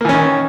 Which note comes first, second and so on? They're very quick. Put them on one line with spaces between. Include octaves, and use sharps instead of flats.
A#3 E3 C#4 D#3